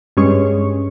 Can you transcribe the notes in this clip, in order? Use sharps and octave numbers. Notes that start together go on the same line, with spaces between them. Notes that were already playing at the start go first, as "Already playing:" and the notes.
G2 G3 G#3 C#4 C#5 C#6